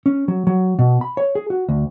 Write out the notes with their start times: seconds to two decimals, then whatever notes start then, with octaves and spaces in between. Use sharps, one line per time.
0.06 C#4
0.28 F#3
0.47 F#3
0.79 B2
1.01 B5
1.17 C#5
1.35 G#4
1.50 F#4
1.69 D2